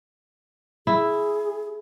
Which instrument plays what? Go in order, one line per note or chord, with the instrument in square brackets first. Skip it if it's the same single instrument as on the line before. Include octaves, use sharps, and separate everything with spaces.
[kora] E4 [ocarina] G#4